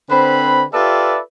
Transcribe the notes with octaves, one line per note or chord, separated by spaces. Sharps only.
D3 C4 B4 C5 B5
F4 G4 A4 B4 D5 E5